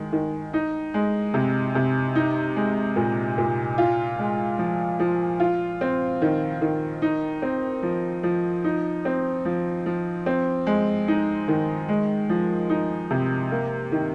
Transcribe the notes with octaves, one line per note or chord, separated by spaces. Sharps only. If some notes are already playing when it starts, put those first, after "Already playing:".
Already playing: D#3 G#3
D#3
D#4
G#3
C3
C3
D#4
G#3
A#2
A#2
F4
G#3
F3
F3
F4
C4
D#3
D#3
D#4
C4
F3
F3
D#4
C4
F3
F3
C4
G#3
D#4
D#3
G#3
F3
D#4
C3
A#3
D#3